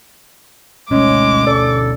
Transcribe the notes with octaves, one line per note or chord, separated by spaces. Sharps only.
D2 B2 G#3 A3 C#4 D6
A4 D5